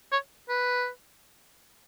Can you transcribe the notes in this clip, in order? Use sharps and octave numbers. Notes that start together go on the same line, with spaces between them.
C#5
B4